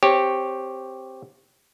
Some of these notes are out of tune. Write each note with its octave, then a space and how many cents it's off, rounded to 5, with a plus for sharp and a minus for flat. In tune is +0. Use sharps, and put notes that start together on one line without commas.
C4 +0 G4 +0 C#5 -10